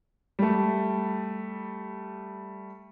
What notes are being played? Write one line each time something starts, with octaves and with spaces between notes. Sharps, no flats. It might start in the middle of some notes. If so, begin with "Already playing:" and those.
G3 A3